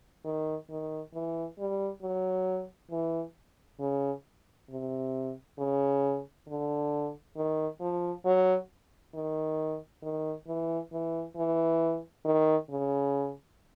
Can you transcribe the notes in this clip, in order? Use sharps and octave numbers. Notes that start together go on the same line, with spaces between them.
D#3
D#3
E3
G3
F#3
E3
C#3
C3
C#3
D3
D#3
F3
F#3
D#3
D#3
E3
E3
E3
D#3
C#3